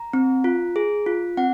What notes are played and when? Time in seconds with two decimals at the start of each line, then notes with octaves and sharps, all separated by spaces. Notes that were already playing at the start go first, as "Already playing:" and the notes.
Already playing: A#5
0.13 C4
0.44 F4
0.76 G#4
1.06 F4
1.37 C4 F#5